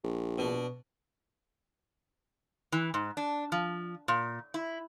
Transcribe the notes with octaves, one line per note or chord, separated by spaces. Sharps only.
A#1
B2 D4
E3
G#2
D4
F3
A#2
E4